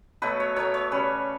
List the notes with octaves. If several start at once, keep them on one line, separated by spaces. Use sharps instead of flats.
B2 F#3 A3 B4
C#5
B2 F#3 A3 C#5
C#5
C#3 G3 B4